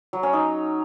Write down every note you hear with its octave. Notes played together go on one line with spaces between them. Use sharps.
F#3
C#4
D#4